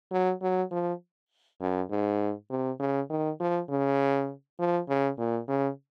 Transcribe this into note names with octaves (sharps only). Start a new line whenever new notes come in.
F#3
F#3
F3
F#2
G#2
C3
C#3
D#3
F3
C#3
F3
C#3
A#2
C#3